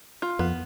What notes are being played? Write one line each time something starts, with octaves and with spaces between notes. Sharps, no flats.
F4
F2 B3